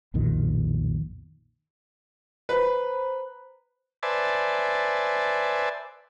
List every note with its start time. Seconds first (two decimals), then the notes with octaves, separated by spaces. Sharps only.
0.14 B1 F2 A#2 D#3
2.49 B4 C5 A#5 B5
4.03 B4 C5 D5 E5 G#5 A5